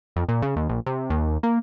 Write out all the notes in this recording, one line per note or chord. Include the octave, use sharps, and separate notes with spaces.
F2
A#2
C#3
D#2
A#1
C3
D#2
A#3